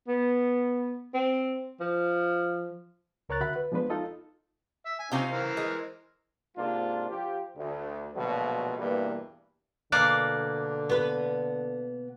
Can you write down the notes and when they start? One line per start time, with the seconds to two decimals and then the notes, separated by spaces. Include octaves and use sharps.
0.07 B3
1.14 C4
1.80 F3
3.29 C#2 A#4 C#5 A#5 F#6 A6
3.41 D3 F#4 E5 F#5 B5 F#6
3.56 B4
3.72 F3 G#3 B3 D4 B4 C5
3.90 D#4 F4 A4 D#5
4.86 E5
4.99 G#5
5.12 C3 C4 C#4 D#4 F4 F5
5.32 E3 A#4 C5
5.57 G#3
6.57 G#2 C3 G#3 A#3 D4 F4
7.09 F3 F4 G4
7.56 D2
8.15 A#1 B2 D3 F3 F#3 A3
8.79 E2 G2 B2 E3 A#3
9.92 B2 D3 A#3 D5 F#6
10.89 B3 B4